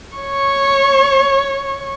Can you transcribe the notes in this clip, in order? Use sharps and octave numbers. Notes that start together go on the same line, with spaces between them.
C#5 C#6